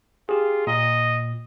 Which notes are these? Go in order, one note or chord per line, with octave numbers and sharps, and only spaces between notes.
F4 G4 G#4
A#2 D#5